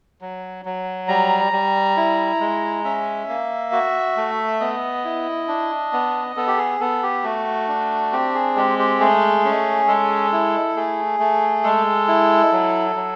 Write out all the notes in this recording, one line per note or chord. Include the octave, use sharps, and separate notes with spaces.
F#3
F#3
G3 A#5
G3
E4
G#3
C#4 E5
A#3
F#4
A3
B3 D#5
E4
D4
B3
B3 A4
G4
G#4
B3 A4
G4
A3 F#4
D4
C4 G4
G#4
G#3 G4
G4
A3 G#4
C#4
G#3 A4
E4
A3 G#4
A3
G#3 A4
E4
F#3
F#3